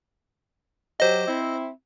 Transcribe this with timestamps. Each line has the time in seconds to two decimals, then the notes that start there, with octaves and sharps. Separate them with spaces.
1.00 F#3 G4 C5 D#5
1.27 C4 E4